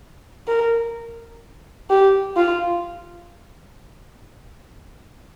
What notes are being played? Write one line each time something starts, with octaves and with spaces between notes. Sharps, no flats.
A#4
G4
F4